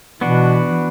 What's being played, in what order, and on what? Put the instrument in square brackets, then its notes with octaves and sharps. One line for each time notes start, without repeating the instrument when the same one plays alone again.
[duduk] B2 [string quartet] E3 [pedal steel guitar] B3 D4 F#4